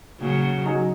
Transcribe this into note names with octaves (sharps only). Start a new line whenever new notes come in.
A#2 C#3 F#3
F#3 D#4 G#4